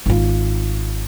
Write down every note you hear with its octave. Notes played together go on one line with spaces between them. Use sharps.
G#1 F4